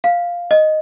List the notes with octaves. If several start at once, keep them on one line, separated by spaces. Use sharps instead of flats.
F5
D#5